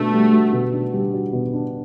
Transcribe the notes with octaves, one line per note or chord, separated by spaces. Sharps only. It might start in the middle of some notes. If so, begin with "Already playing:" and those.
Already playing: B2 A3 D4 F#4
G3
F#4
B2
D4
G3
F#4
B2
D4